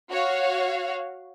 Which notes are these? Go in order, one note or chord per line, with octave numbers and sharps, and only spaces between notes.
F#4 C#5 F5